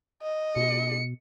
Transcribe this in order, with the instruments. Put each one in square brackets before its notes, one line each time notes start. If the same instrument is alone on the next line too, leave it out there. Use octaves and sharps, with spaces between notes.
[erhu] D#5
[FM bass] B2 [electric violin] C#7